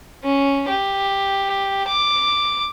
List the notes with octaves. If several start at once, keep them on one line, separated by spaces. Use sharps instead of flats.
C#4
G4
D6